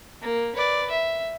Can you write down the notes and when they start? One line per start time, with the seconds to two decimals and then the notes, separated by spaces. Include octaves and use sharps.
0.22 A#3
0.56 B4 D5
0.90 E5